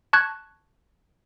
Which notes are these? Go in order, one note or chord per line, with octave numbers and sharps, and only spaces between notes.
A5 C#6 F#6 G#6